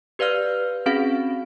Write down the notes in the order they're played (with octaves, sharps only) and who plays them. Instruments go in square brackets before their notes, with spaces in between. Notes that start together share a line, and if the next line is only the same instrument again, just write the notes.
[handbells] G4 B4 D5 F5 F6
C4 C#4 F#4 G#4 F5